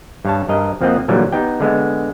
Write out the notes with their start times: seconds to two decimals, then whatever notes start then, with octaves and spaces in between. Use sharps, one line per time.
0.25 G2 C#5 A5
0.49 G2 A#4 D#5
0.81 F2 F3 A#3 C4 D#5 F#5
1.08 A#2 D3 E3 F#3 G3
1.32 B3 D#4 G4 G5
1.60 D3 G#3 B3